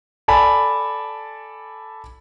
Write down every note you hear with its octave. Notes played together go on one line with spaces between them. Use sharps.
A4 D5 G#5 A5 B5